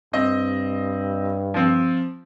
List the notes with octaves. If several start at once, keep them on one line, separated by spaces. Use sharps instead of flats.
G2 C4 D#5
F3 C4